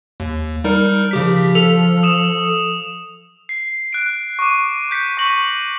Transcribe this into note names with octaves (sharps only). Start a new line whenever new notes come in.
D#2
G3 D#4 A#4
C#3 F3 G4 B6
A4 F7
D#6 E7
C7
F#6 D7
C#6 D6
G6 B6 C#7
C#6 A#6 F#7